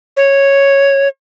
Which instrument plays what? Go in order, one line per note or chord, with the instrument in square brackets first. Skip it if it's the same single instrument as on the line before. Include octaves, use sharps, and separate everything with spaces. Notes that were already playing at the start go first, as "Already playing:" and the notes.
[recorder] C#5